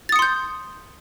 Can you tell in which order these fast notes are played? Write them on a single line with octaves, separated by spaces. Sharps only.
A6 D#6 C#7 C6 G6